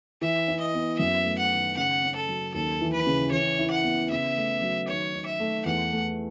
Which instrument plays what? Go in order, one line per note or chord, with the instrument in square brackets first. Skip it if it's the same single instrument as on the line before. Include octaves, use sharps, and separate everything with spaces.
[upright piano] E3 [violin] E5
[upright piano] E4
[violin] D#5
[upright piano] B3
[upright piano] F#2 [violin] E5
[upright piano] A3
[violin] F#5
[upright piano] D#3
[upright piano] C#3 [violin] F#5
[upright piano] C#4
[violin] A4
[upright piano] F#3
[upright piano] D#2 [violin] A4
[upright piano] E3
[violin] B4
[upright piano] C#3
[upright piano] E3 [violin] C#5
[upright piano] E4
[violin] F#5
[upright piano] B3
[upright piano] C#3 [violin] E5
[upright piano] A3
F#3
[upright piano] D#3 [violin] C#5
[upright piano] D#4
[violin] E5
[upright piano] A3
[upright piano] E2 [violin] F#5
[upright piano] A3